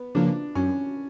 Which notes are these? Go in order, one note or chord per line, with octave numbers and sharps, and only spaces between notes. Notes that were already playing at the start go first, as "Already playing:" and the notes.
Already playing: B3
C#3 F3 A#3 D4
F#2 C#4